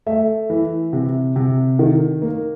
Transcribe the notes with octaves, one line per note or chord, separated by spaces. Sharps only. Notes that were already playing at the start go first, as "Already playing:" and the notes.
A3 E5
E3
C3
C3
D#3
A#3